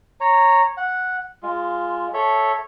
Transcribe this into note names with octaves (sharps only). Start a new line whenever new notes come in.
C#5 A#5
F#5
G#3 F4
A4 C#5 E5